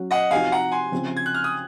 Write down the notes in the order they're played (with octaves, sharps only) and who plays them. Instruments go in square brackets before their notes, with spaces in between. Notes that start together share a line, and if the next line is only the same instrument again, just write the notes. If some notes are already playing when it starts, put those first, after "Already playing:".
Already playing: [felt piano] F#3 C#4 F#4
[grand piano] D#5 F#5
[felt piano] C3 F3 C4 D#4 F#4 [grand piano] F5 G#5
[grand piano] F#5 A#5
G#5 C6
[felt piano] C#3 F3 C4
[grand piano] G#6
F#6
F6
D#6